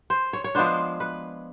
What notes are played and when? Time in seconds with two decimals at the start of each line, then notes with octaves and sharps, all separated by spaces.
0.10 C5
0.33 C#5
0.44 C#5
0.55 F3 G#3 B3 D4 C5
1.00 B4